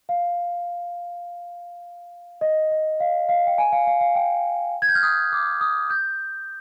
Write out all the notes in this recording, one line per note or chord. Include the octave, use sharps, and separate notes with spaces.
F5
D#5
D#5
F5
F5
G5
G#5
F5
F5
F5
G5
G#6
G6
F6
D#6
D6
D#6
G6